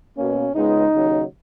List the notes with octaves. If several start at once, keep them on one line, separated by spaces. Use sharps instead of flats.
B2 A#3 C#4
C#2 C#3 G#3 B3 D#4
D#2 C#3 F#3